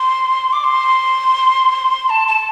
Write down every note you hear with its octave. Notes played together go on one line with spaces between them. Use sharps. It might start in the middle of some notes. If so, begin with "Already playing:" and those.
Already playing: C6
D6
C6
A5
A5